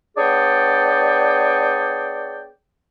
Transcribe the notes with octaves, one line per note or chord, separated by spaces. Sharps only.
B3 D4 G#4 C#5 D5 G5